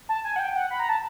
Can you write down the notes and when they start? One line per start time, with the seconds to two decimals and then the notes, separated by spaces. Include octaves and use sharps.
0.09 A5
0.24 G#5
0.36 F#5
0.39 G5
0.56 F#5
0.71 B5
0.80 A#5
0.89 A5